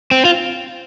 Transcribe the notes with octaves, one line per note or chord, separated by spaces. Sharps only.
C4
F4